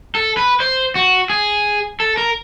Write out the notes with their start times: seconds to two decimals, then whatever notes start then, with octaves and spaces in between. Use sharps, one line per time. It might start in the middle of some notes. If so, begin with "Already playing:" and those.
0.15 A4
0.37 B4
0.60 C5
0.95 F#4
1.30 G#4
2.00 A4
2.17 A#4